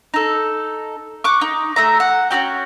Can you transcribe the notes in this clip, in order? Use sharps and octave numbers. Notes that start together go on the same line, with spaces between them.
D#4 A4
C#6 D6 F#6
D#4
A3 E5 A#5
F#5
C#4 E4 F#4 G5